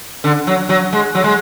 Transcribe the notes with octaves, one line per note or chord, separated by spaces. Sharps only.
D3
F#3
F#3
G#3
F#3
G#3